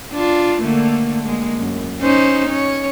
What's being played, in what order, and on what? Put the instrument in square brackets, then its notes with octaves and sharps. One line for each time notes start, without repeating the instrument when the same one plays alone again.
[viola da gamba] D4 F4
D3 A3 A#3
G#3 A#3
F#2
C#4 D#4 C5
C#4 C#5